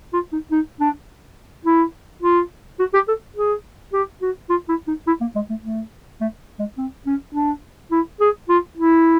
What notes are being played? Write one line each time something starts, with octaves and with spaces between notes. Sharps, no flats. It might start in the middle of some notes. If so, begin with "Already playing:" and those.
F4
D#4
D#4
D4
E4
F4
F#4
G4
A4
G#4
G4
F#4
F4
E4
D#4
E4
A#3
G#3
A3
A3
A3
G#3
C4
C#4
D4
E4
G#4
F4
E4